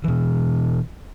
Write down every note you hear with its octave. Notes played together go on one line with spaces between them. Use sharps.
B2 E3